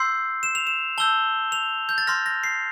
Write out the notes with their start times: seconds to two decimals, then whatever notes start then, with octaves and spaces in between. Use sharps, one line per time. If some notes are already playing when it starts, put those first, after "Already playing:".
Already playing: C6 E6 G6 C7
0.43 E7
0.55 F7
0.67 E7
0.98 A5 E6 G6 G7
1.52 F7
1.89 G6
1.98 A6
2.07 C6 F6 A#6
2.26 A#6
2.44 C7